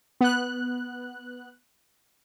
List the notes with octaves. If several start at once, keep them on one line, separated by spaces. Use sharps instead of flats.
B3 F#6